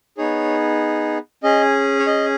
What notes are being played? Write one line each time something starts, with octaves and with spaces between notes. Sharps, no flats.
B3 D#4 G#4 C#5
C#4 G#4 D#5
C#5
D#5